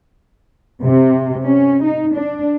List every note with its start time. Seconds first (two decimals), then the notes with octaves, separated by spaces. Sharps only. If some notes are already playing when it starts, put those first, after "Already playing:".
0.83 C3
1.46 C#4
1.83 D#4
2.15 D4